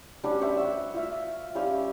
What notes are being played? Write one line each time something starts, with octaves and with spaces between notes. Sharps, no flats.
G3 C#4 D4 F#4
C5 C#5 E5 F#5
F#5 E6
F4 E5 F5
G3 C#4 C5 F5